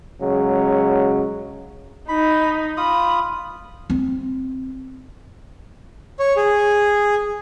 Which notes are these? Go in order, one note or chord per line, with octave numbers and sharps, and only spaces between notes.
C#3 F#3 G#3
D#4 B5
F4 B5 D#6
C4
C#5
G#4